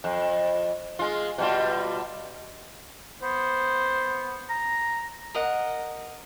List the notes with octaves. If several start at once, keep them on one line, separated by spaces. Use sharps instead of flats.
F2
G#3 F4
B2 G3 F4
B3 C5
A#5
A#4 D#5 F#5